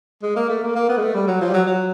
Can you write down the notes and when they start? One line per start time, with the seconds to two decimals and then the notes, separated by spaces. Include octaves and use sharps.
0.23 G#3
0.36 A#3
0.50 A3
0.63 A#3
0.76 A#3
0.89 B3
0.98 G#3
1.02 A3
1.14 G3
1.28 F#3
1.41 F3
1.50 G3
1.54 F#3
1.67 F#3